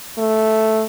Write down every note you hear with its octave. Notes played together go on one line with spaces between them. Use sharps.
A3